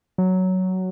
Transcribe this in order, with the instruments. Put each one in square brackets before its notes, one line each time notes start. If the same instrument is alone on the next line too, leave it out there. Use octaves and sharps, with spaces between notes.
[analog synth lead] F#3